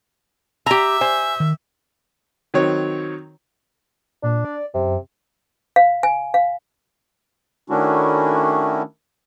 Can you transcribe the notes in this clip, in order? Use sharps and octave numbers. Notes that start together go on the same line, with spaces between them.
G4 E5 A#5
C5 G#5
D#3
D#3 F#3 C4 C#5
A#2 D4
D5
F#2 C3
F5
G#5
F5
D#3 A3 C#4 D4 E4 F#4